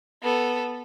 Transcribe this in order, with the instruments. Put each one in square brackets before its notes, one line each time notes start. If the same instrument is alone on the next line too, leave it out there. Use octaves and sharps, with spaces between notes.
[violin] B3 A4